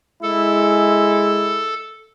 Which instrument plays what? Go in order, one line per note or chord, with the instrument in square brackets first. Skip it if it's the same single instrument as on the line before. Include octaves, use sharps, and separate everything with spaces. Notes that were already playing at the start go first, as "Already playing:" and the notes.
[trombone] G#3 [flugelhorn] E4 [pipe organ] A4